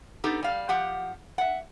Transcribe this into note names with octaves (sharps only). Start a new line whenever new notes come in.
B3 D#4 G4 A4
G3 F5
F3 G4 F#5
E5 F#5